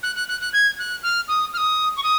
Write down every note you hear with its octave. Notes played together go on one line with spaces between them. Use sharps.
F#6
F#6
F#6
F#6
G#6
F#6
F6
D#6
F6
D#6
C#6
D#6